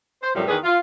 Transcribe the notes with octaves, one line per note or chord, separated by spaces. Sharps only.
C5
F#2 A2 C3 F3 G3
E2 D#3 G#4 B4
F4